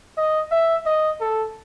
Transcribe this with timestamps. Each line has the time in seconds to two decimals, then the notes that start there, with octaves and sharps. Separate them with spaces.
0.17 D#5
0.51 E5
0.86 D#5
1.20 A4